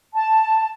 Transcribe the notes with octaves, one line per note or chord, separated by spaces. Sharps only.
A5